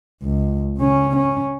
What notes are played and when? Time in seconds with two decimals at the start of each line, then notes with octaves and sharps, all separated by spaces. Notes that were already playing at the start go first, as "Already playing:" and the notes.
0.23 C#2
0.77 C#3 C#4
1.16 C#4